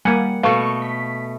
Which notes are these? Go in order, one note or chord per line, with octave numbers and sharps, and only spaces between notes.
G3 A#3 F#5 G#5
B2 A3 B4 F5 C#6
B6